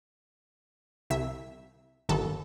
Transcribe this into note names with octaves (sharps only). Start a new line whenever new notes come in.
C2 E5
G1 D#2 A4